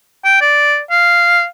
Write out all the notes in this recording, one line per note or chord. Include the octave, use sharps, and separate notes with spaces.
G5
D5
F5